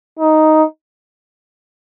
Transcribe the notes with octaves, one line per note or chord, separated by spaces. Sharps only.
D#4